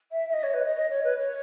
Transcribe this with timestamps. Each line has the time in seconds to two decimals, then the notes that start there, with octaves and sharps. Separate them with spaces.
0.11 E5
0.28 E5
0.33 D#5
0.43 C#5
0.53 B4
0.65 D#5
0.76 D#5
0.90 C#5
1.04 B4
1.18 C#5